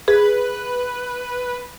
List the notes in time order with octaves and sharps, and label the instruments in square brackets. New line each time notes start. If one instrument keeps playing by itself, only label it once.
[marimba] G#4 [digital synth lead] B4